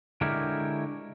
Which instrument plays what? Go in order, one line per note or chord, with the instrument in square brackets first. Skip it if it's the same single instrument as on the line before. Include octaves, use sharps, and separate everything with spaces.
[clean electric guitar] D3 G#3 E4 G4 A#4 C#5